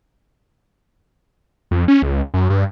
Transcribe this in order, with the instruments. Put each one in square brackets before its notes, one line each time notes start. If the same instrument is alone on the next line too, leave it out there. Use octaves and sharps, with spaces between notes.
[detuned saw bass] F2
C#4
C#2
F#2
G2